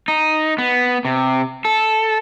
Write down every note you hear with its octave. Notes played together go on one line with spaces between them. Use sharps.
D#4
B3
C3
A4